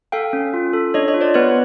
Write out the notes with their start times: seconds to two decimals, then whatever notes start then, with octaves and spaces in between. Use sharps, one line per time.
0.12 A4 F5 G5
0.33 C#4
0.54 F4
0.73 A4
0.94 D4 C#5 D#5
1.08 C#5 D#5
1.14 F4
1.21 C5 D5
1.34 B3 B4 C#5